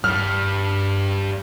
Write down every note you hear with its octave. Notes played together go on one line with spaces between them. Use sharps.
G2 G3 F6